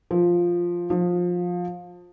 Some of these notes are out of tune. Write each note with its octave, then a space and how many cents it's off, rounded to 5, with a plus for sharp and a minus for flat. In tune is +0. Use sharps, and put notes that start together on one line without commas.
F3 +0
F3 +20